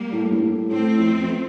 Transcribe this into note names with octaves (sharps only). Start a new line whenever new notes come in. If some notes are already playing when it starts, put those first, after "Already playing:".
Already playing: G3 A#3
A2
G2
A2
A2 A3 C4
F2
F2